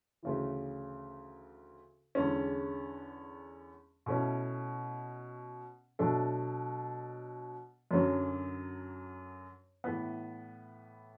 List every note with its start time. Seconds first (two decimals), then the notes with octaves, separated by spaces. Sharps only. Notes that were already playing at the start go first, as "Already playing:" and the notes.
0.23 D2 C#3 E3
2.15 E2 D3 G#3 C#4
4.06 B2 A3 C#4 E4
5.99 B2 F#3 A3 D4 A4
7.91 F#2 D3 F#3 C#4
9.84 A2 E3 B3